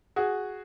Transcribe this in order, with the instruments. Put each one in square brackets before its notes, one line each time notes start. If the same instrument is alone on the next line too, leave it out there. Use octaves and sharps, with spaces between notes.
[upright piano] F#4 G#4